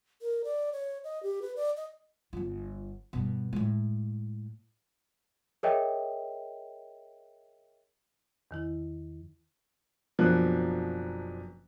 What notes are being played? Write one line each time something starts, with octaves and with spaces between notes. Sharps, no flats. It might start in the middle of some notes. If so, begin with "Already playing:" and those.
A#4
D5
C#5
D#5
G4
B4
D5
D#5
G1 F4
G2 B2
A2 G#3
G#4 A#4 C#5 D#5 E5 G5
E2 D#3 E4
F#1 B2 F3 F#3 D4 F#6